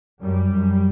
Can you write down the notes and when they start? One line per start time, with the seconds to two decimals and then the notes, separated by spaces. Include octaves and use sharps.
0.23 F#2 G3
0.53 F#2